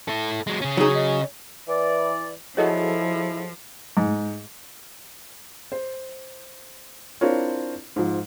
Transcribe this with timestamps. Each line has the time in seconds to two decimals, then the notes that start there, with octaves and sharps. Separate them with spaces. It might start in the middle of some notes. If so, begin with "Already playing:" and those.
0.08 E4 A4
0.47 F#3 G#3
0.61 C#3 C#4
0.77 F#3 D#4 G#4
0.95 D#5
1.68 E3 D5
2.57 F3 E4 F#4 G#4 A4 C#5 D#5
3.97 G#2
5.72 C5
7.21 C4 D4 E4 F4 A#4 C#5
7.96 G#2 F3